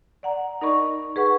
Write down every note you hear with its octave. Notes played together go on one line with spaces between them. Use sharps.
D5 F#5 A#5
D#4 A#4 D5 D#5 B5 C#6
G#4 B4 F#5 C#6